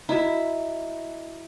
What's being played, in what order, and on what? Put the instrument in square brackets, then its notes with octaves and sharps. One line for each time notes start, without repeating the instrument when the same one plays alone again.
[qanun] E4 E5 [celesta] F#4 D#5 A#5